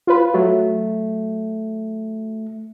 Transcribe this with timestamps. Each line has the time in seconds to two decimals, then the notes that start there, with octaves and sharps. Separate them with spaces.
0.07 F4 B4
0.34 F#3 A3